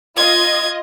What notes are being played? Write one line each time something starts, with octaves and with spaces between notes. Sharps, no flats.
F4 D#5 G#6